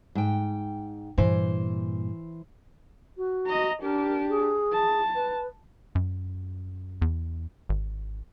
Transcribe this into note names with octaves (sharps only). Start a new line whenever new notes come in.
G#2 G5
G2 A#2 E3 C5
F#4
D#5 A#5
D4 G4 A#4
G#4
A5
B4
F#2
E2
G#1